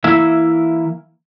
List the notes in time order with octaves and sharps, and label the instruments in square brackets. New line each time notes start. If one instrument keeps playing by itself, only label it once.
[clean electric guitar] E3 A#3 E4 E5